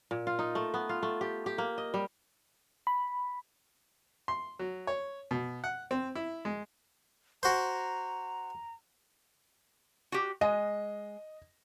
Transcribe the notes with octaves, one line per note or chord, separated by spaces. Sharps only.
A#2
F4
D#4
A3
B3
F4
A3
G4
G4
A#3
D#5
G3
B5
C6
F#3
C#5
B2
F#5
C4
E4
G#3
F#4 C5 A#5
F#4 G4
G#3 D#5